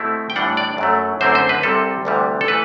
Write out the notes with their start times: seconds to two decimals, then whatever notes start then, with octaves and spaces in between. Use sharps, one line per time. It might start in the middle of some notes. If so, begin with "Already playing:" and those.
Already playing: B2 A3 C4 E4
0.30 G5
0.36 A2 E3 G3 D4 F#5
0.57 D5
0.78 F#2 F#3 A3
1.21 F#2 D3 A3 C4 E4 C5
1.35 C5
1.49 B4
1.63 C2 C3 G3 C4 A4
2.05 D2 C3 E3 G3 B3
2.41 A4
2.48 E3 A3 B4